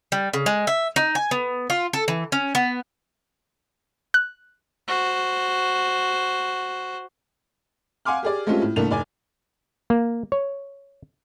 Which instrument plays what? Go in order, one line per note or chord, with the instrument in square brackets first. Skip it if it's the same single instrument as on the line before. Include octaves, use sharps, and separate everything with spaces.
[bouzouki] G3
C#3
G#3
E5
D#4
G#5
B3
F4
A4
E3
C#4
B3
[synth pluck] F#6
[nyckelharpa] F#4 C5
[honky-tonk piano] F5 F#5 G#5 C6 D6 F6
G4 G#4 D5
G#3 A3 C4 C#4 F4 G4
A2
C2 A3 A#3 D4 F7
F1 D5 G#5
[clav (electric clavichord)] A#3
C#5